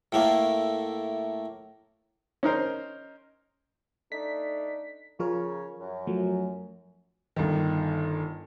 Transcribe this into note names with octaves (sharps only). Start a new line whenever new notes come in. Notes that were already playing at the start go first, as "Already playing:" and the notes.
A2 A3 A#3
C#4 D#4 A#4 C5
A3 D4 D#4 B6
C#3 F3 C#4 F4 A#4 C#5
F#2
F3 F#3 A3
G1 D#3